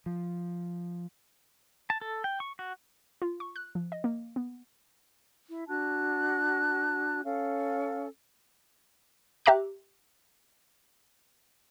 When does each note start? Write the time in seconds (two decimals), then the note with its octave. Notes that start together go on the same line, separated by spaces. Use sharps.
0.06 F3
1.90 A5
2.01 A4
2.24 G5
2.40 C#6
2.59 F#4
3.22 F4
3.40 C#6
3.56 F#6
3.75 F3
3.92 D#5
4.04 A#3
4.36 B3
5.49 E4
5.68 D4 F#4 A5 F#6
7.25 C#4 A4 F5
9.46 G4 E5 A#5 D6 F#6